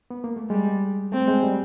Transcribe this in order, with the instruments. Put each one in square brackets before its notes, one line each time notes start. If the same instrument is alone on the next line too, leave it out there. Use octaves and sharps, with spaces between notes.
[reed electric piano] B3
A#3
A3
[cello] G3 [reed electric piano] G#3
[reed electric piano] A3 [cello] C4
[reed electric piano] G#3
G3